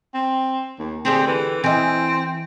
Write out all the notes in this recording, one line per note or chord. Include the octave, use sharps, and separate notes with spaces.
C4
D#2
D3 C4 G4 G#4
E3
E3 C4 D#5